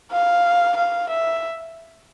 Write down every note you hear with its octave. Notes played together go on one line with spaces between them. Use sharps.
F5
F5
E5